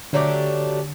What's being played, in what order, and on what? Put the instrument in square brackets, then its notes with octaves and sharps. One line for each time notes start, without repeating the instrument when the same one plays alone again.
[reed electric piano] D3 [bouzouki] F#3 A3 D4 G4